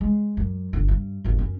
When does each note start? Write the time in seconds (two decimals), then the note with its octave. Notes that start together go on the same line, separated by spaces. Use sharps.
0.01 G#3
0.37 F#2
0.73 G1 D3
0.88 G2
1.24 G#1 D#2
1.38 F#2 C#4